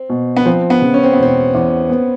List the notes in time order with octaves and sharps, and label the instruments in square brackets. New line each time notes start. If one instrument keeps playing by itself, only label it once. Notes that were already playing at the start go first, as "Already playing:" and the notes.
Already playing: [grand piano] C4
[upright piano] B2
[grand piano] B3
[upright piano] F3 [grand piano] C4
[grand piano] B3
[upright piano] C#3
[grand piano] C#4
C4
B3
[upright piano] E1 [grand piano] C4
[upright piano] E2
B3